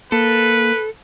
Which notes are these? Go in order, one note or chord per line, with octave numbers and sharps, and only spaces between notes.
A#3 A4 B4